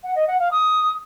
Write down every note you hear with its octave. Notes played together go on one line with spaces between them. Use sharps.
F#5
D#5
F#5
F5
D#6